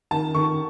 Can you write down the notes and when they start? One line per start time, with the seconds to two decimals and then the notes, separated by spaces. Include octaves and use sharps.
0.11 D#3 A5
0.34 D#3 C#6